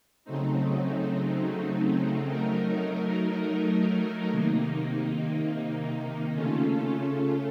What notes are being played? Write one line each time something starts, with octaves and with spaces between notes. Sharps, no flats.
C#3 F#3 A3 C4 D#4
F#3 A3 D#4 A#4
C3 D#3 A#3 D#4
C#3 A3 C#4 F4 A4